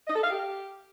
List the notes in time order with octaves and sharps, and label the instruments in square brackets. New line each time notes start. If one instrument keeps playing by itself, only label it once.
[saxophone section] D#5
A4
F5
G4